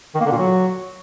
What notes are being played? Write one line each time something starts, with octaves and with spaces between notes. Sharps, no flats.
D#3
A#3
D3
A#2
F#3